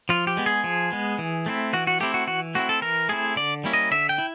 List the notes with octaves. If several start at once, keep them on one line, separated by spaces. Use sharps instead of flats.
F3 F4
G4
G#3 B3
G#4
F3
G#3 B3
E3
A3 C4 E4
E3 F#4
F#4
A3 C4 E4 G4
F#4
E3 F#4
A3 C4 E4 F#4
A4
E3 A#4
A3 C4 E4 G#4
D3 D5
G3 A#3 C#4 E4
D#5
D3 E5
G5
E4